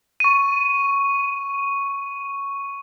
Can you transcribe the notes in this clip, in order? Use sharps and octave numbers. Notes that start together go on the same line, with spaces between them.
C#6 D#7